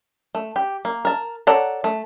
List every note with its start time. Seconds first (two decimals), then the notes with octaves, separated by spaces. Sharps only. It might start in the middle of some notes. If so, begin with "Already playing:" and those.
0.35 A3
0.56 G4
0.85 A#3
1.05 A#4 A5
1.47 A4 C#5 D5 F#5 A#5
1.84 A3